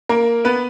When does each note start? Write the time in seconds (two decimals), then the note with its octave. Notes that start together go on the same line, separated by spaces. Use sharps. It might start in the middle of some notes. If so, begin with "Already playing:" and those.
0.09 A#3 A#4
0.45 B3 B4